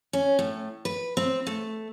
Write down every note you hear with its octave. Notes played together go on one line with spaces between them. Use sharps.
C#4
A2
B4
C4
A3